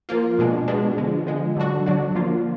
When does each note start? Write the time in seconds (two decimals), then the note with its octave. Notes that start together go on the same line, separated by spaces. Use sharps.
0.09 F3 A#3 F4
0.39 B2 G#3 D4
0.68 B2 G#3 D4
0.98 D3 F3 G#3
1.27 D3 F3 G#3
1.56 D3 F#3 D4 F#4
1.86 D3 F#3 D4 F#4
2.15 F3 A#3 F4